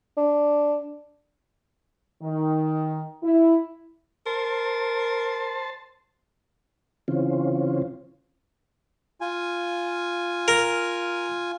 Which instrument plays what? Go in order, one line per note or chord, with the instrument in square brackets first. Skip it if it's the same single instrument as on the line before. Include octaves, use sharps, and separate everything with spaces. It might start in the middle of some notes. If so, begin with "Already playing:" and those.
[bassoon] D4
[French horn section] D#3
E4
[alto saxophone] A#4 [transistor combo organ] C5 A5
[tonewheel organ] C#3 E3 C4 C#4 F4
[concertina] F4 G#5
[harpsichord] A#4